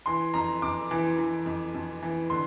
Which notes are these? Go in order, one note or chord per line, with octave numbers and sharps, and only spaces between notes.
E3 C6
F2 A#5
F2 D6
E3
E3
F2
F2
E3
D3 C6